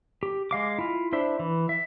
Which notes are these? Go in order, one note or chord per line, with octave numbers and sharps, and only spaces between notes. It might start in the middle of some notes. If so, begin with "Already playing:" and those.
G4
G#3 F5 D6
E4 F4
D4 E4 C5 E5
E3
E5